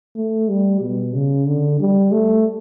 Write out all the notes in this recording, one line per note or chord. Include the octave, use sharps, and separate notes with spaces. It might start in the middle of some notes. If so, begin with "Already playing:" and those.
A3
G3
B2
C#3
D3
G3
A3